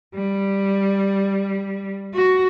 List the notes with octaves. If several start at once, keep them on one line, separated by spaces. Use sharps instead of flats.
G3
F#4